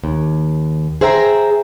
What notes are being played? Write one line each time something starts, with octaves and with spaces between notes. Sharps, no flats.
D#2
G#4 C5 E5 G5 A#5